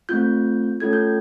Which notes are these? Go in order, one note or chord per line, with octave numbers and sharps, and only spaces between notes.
A3 C4 F4 G6
A3 C#4 F4 A4 G#6
G6